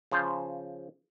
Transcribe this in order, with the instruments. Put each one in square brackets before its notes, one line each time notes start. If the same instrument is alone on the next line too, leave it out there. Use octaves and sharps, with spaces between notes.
[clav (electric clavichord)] C#3 F3 C5